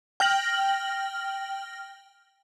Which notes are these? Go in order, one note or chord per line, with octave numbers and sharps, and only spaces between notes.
G5 F6 A#6 F#7